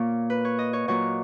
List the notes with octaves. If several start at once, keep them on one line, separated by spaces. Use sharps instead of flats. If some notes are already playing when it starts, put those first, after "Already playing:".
Already playing: A#2 A#3 C#5
B4
C#5
D#5
C#5
A#2 F#3 A#3 C#5